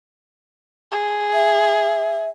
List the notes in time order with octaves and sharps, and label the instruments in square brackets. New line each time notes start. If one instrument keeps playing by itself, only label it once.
[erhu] G#4
[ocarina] E5